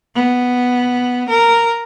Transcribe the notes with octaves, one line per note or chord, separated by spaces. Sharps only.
B3
A#4